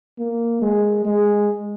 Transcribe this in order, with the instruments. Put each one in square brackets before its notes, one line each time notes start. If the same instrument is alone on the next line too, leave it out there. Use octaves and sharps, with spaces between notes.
[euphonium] A#3
G#3
G#3